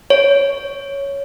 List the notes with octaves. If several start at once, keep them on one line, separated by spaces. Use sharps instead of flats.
C#5